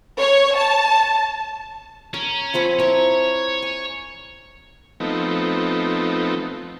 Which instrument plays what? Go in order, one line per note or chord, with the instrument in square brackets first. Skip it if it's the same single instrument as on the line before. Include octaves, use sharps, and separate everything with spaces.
[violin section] C#5
A5
[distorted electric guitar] C#4 [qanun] A#4
[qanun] F3 C4 B5
[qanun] E4 A#4 [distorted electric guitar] C#5
[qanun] G#5
[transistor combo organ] F3 A3 B3 C4 D#4